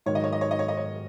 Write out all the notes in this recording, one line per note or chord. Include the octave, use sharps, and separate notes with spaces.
G#2 D#3 F#3 C#5
D#5
C#5
D#5
C#5
D#5
C#5
D#5
C#5